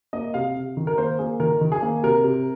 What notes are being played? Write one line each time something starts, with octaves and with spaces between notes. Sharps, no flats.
A#3 D#5
C3 F5
C3
D#3
A#4
A#3 C5
A#3 G#4
D#3 A#4
D#3
G#4
A#3
C3 A#4
C3